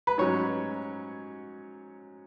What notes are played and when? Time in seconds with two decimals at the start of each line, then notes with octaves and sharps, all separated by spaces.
0.07 B4
0.18 G#2 F#3 C#4 C#5